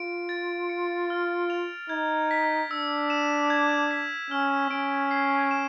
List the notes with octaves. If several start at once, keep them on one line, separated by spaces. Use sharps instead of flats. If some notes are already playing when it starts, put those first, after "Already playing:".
Already playing: F4 D7
A6
C#7
F6
F7
D#4 G#6
B6
D4 E6
E7
G#6
B6
C#4 F6
C#4 D7
C7
E7